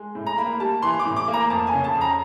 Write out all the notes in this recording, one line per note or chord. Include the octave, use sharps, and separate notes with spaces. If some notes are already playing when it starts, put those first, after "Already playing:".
Already playing: G#3
A2
A#5
A#3 B5
G3 A5
E3 C6
D6
A2
D6
A#3
A#5
F2 A5
G#5
C#3
A5
F2
A#5